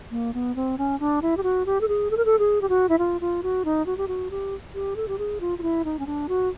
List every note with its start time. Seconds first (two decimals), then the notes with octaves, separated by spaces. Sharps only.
0.11 A#3
0.34 B3
0.56 C4
0.78 C#4
1.00 D4
1.22 E4
1.37 G4
1.43 F#4
1.66 G4
1.81 A4
1.88 G#4
2.11 A4
2.17 A#4
2.25 A4
2.39 G#4
2.62 G4
2.69 F#4
2.89 E4
2.99 F4
3.21 F4
3.43 F#4
3.65 D#4
3.86 F#4
3.98 G4
4.08 F#4
4.31 G4
4.74 G4
4.96 A4
5.08 G4
5.19 G#4
5.40 F4
5.58 F4
5.63 E4
5.85 D#4
5.99 C#4
6.07 D4
6.29 F#4